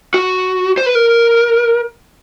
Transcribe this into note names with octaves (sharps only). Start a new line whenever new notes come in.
F#4
C5
B4
A#4